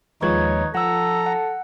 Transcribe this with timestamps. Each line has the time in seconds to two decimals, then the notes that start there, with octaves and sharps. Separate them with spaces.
0.22 D#2 F3 G#3 D#4 B4 C#5 C#6 G#6
0.75 F3 A4 F#5 A#5 E6
1.26 F#5